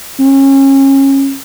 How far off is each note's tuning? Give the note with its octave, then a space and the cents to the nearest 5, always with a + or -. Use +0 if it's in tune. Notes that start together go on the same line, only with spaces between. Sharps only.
C#4 -25